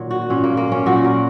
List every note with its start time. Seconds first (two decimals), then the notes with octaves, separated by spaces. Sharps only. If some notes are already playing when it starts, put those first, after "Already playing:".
Already playing: A#2 D#3 F#3
0.11 F#4
0.30 A#2 F#3 C#4
0.44 A#3
0.57 A#3
0.72 C#4
0.86 A#2 F#3 F#4
1.04 A#4